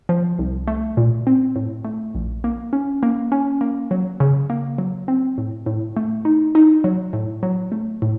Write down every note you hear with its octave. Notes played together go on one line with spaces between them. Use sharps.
F3
C2
A3
A#2
C4
A2
A3
A#1
A#3
C#4
A#3
C#4
A#3
F#3
C#3
A#3
F#3
C4
A2
A2
A3
D#4
D#4
F#3
A2
F#3
A3
A2